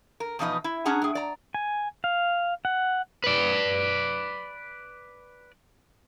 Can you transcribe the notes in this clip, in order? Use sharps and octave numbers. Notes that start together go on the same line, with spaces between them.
A#4
E2 B2 F3 D#4 B4 D#5
E4
C#4 D4 G#4 F#5 A#5
A2 G#4
D5 A#5
G#5
F5
F#5
B4 D5